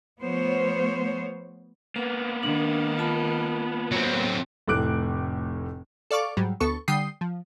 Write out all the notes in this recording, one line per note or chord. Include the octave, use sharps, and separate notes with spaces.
F3 A3 B3 C5 C#5
A#3 B3 B4
D#3 D4
F4 A5 B5
F#3 C4
F1 A2 A3 D6 F#6 D7
A4 D5 F5 C#6 D6
G#2 F#3 G3
D2 B3 A4 C#6
D3 G3 G5 D#6 C7
F3